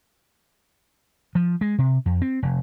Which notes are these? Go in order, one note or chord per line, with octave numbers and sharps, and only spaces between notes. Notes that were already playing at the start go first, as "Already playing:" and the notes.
F3
G#3
C3
F2
C4
F1